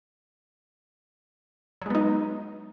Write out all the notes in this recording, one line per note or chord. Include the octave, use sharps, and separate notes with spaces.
F#3 G#3 B3 D#4